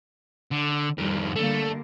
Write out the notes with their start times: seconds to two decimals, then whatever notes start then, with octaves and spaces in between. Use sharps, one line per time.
0.51 D3
0.98 F2 D#3 F3 G3
1.36 D3 G3 A3 A#3